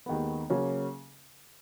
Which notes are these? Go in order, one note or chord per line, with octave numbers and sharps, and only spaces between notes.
D#2 D#3 G#3 B3
C#3 F#3 A#3 C#4